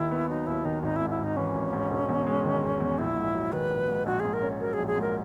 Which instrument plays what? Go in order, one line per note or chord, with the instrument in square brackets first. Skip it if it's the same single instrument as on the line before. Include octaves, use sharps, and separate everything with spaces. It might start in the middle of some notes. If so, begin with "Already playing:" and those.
Already playing: [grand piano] D#2 D#3 [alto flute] E4
[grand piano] B3
[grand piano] F#3 [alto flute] D#4
[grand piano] D#2 [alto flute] E4
[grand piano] D#3 [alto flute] D#4
[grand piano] G#1 [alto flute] D#4
[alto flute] E4
[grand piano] G#2
[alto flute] E4
[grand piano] G#1 [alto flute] D#4
[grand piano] E3 [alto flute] C#4
[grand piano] G#1
G#2
E1
E2
G#3
D#3
E1
E2
[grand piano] A#1 [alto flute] E4
[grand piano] G#2
F#3
[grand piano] D#3 [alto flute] B4
[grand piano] A#1
G#2
[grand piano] A#1 [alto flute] F#4
[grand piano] G#2 [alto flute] G#4
[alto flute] A#4
[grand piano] C#4
[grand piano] F#3 [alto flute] A#4
[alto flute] G#4
[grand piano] A#1
[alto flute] G#4
[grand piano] G#2
[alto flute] A#4